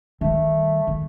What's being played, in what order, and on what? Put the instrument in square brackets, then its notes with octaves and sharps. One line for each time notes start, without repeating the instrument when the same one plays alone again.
[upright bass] D#3 G3 [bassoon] A3
[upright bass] D#3